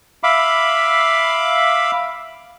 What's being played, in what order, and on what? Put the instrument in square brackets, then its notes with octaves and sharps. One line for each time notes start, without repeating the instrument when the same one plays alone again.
[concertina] E5 F5 B5 D6